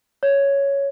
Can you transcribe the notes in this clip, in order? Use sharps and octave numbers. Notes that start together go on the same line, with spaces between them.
C#5